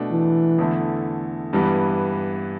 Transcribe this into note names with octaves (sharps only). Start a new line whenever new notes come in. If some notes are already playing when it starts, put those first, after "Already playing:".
Already playing: B2 A3 D4
E3
E2 D3 A3 E4
G2 E3 G3 B3